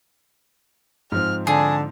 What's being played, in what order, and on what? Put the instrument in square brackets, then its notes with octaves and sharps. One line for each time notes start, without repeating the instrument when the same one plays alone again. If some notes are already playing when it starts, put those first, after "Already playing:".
[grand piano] G#2 F3 C4 [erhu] F6
[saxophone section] D3 [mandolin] G#4 [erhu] A5